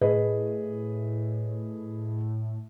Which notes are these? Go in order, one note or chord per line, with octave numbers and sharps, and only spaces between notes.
A2 G#4 B4 D#5